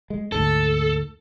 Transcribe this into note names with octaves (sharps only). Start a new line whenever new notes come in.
G#3
D2 G#2 A4